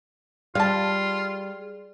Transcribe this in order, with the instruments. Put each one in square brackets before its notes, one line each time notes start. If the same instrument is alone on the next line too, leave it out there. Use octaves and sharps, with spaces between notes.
[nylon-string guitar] G3 [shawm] F4 [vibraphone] G#4 [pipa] F5 A5